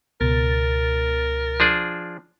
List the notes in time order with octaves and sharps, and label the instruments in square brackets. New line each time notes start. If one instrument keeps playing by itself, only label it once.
[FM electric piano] C#2 B2 A6 [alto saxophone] A#4
[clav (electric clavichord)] F3 D4 G#4